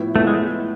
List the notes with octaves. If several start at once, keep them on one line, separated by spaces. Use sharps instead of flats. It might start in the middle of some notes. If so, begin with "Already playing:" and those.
Already playing: A2 F3 B3 E4
A2 F3 A3 B3 E4
G#3